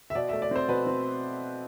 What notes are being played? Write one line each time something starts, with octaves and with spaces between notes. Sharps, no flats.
E5
B2 D5
A3 E5
D5
C4 C5
B2 B4
C4